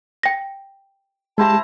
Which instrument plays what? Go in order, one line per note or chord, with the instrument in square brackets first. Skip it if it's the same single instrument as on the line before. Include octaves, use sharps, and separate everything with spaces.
[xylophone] G5 A#6
[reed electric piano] G#3 G4 [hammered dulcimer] E4 C5 A#5 [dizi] A5